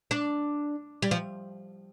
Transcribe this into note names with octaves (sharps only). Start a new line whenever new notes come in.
D4
G3
F3